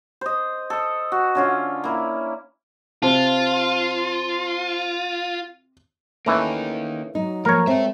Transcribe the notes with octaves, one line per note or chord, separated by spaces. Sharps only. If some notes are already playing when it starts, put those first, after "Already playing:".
C5 D#5
A4 D#5
F#4
D3 C#4 F4
A#3 E4
C3 F4 C5 A5
E3 A3 A#3 C#4 D#4
F#3 D#4
F3 A#3 A#4 C#5
G#3 C4 A4 E5